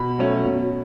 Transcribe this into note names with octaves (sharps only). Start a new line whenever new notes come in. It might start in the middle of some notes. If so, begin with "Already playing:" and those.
Already playing: B2 B5
F#3 A3 C#4
B2